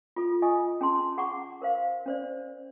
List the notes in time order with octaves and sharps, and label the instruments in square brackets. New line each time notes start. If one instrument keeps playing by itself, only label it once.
[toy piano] F4 A4
F4 D#5 G#5 C#6 D#6
C#4 G#4 A5 C6
G#4 F#5 A#5 C#6 D6
A#4 C5 F5
C#4 C5 D5